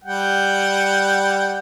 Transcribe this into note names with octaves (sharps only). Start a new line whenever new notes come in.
G3 F#5 G5